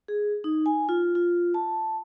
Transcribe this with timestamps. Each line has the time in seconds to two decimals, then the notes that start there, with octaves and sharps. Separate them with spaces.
0.08 G#4
0.44 D#4
0.66 G#5
0.89 F4
1.15 F4
1.54 A5